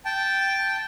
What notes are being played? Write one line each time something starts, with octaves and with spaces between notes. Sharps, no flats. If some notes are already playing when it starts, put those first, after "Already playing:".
G5 A5